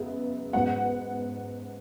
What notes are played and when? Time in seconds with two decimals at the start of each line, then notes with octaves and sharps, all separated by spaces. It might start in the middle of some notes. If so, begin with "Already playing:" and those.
Already playing: F#2 C#3 G#3 B3
0.53 G#2 F#3 B3 F#5